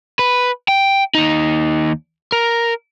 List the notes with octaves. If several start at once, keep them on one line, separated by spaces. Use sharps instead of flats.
B4
G5
D#2 D#4
A#4